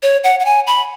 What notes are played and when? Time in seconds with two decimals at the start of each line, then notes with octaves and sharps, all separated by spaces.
0.03 C#5
0.24 F#5
0.40 F#5
0.45 G#5
0.67 B5